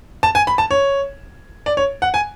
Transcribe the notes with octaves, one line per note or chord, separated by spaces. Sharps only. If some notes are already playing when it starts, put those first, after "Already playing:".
A5
G#5
B5
A5
C#5
D5
C#5
F#5
G#5